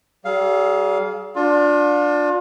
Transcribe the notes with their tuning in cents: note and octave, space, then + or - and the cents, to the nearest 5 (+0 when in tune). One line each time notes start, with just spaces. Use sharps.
G3 -35 G#4 +35 F5 +0
D4 +0 F4 +35